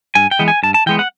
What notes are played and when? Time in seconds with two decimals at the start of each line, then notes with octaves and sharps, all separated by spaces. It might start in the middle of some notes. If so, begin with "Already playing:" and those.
0.15 G2 G#5
0.31 G5
0.39 E3 G#3 B3
0.48 G#5
0.63 G2 A5
0.74 A5
0.86 E3 G#3 B3 G5
0.99 F#5